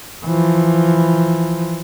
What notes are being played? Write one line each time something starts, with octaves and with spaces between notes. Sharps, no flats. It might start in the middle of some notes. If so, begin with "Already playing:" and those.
E3 F3